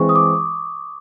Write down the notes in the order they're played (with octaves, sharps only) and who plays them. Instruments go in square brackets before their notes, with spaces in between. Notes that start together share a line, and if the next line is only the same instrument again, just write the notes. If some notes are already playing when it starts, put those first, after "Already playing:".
Already playing: [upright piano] E3 G#3 C4 [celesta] C#6
[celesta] D#6
D6